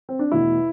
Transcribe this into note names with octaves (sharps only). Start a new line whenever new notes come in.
C4
D4
E2 B2 A3 E4